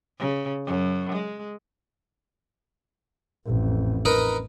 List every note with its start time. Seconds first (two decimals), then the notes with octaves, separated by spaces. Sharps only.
0.19 C#3
0.66 F#2
1.12 G#3
3.46 A1 F2
4.05 D#4 A#4 B4